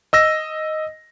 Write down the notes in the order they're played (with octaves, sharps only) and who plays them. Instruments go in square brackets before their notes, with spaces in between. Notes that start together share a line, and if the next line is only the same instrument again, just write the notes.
[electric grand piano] D#5 E6 A#6